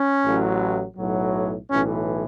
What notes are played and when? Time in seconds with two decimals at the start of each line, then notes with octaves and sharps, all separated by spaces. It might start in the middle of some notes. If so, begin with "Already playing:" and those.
Already playing: C#4
0.23 A1 A2 F#3
0.97 B1 A2 F#3
1.70 B1 A2 E3 C#4